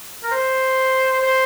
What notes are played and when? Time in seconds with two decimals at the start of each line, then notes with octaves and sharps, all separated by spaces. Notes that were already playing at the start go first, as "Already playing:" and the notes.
0.24 A#4
0.31 C5
1.22 C5